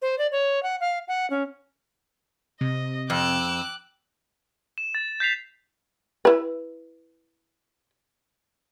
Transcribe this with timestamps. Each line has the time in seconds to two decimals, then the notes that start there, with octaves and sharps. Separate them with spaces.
0.02 C5
0.18 D5
0.32 C#5
0.63 F#5
0.80 F5
1.08 F#5
1.30 C#4
2.61 C3 D#5
3.10 F2 G5 D6 E6 F#6
4.78 E7
4.95 A6
5.20 G6 B6 C7 F7
6.25 E4 B4